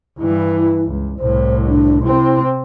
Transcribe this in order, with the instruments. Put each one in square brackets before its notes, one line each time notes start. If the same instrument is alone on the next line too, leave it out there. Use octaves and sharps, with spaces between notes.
[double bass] G2 E3 [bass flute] E4
[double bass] C#2
[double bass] C2 A2 [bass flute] C5
[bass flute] D4
[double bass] C3 C4 [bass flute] E4